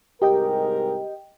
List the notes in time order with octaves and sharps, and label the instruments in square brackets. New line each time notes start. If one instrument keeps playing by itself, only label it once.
[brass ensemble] C2 G#2 A#4 [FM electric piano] G4 D#5 G5